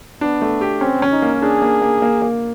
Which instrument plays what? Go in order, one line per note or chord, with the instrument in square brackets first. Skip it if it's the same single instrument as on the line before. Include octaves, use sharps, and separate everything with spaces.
[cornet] B3 [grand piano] D4
[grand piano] A3
G4
[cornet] C4 [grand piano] C#4
[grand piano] C#4
[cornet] D#4
[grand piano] A#3
[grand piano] D4 [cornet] G#4
[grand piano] A#3
A#3
A#3
A#3